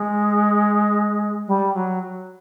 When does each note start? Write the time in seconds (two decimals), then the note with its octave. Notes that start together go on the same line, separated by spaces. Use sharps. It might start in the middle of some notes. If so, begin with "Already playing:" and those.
Already playing: G#3
1.48 G3
1.74 F#3